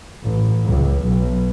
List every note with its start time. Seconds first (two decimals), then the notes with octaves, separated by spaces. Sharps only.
0.23 A1
0.65 C#2
1.03 B1